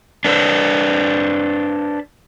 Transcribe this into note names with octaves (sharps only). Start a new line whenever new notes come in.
D4 B4 C5